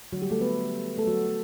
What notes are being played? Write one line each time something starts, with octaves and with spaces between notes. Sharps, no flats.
D3 F#3 A3 F#4
G3 G4
A3 A4
B3 B4
A3 A4
F#3 F#4
F#3 A3